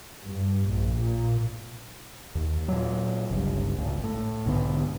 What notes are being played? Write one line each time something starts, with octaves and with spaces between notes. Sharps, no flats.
G2
A#1
A#2
D#2
A#2 F#3
G1 C#2
G#1 C#2
A2
B1 G#2 D3 B3